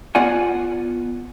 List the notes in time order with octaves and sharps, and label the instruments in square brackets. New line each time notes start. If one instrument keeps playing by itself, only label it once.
[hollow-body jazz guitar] B3 F4 D5 F#5 G#5